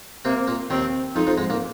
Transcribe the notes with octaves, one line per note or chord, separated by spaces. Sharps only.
C3 A#3 C4
A#2 A#3
D#2 D#3 C4
F2 F3 D#4
F2 F3
G#2 G#3
A#2 A#3